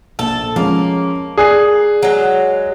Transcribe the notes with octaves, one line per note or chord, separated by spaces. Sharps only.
A#1 A4
F3 G#3 A#3 C#4
G#4 D5 F#6 C7
F#3 G#3